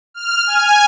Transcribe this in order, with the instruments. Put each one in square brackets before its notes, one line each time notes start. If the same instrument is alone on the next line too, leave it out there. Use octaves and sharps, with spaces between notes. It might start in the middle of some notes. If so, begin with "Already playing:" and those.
[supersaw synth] F6
G#5